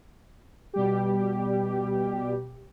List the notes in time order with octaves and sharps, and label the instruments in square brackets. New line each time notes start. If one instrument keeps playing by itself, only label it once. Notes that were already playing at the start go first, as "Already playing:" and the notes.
[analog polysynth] B2 G3 G4